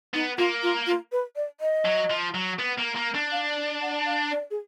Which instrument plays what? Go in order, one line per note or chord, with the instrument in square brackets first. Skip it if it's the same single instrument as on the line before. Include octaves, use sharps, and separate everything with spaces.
[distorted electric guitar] B3 [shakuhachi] D#4
[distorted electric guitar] A#3 [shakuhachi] F4
[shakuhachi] F4
F4
B4
D5
D#5
[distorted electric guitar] F#3
F3
F#3
B3
A#3
A#3
D4
[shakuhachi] F5
F#5
F5
D5
G#4